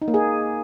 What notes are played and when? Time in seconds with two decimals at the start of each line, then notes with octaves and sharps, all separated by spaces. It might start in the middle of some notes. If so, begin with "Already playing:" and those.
0.02 D#4
0.08 A#3
0.14 G#4